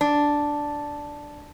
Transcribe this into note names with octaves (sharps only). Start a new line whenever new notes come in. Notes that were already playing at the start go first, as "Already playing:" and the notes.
D4